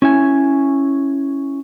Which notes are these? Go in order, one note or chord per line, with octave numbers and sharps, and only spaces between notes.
C#4 E4 G#5